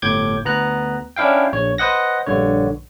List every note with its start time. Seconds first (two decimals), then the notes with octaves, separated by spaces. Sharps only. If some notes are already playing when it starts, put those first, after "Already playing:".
0.02 G1 A2 D6 G6 G#6
0.45 D2 B3 A#5 F#6
1.16 C#4 D4 E4 F5 G5
1.53 A#1 C#5
1.78 B4 C5 D#5 F#5 A#6
2.27 A#1 G2 D3 C#5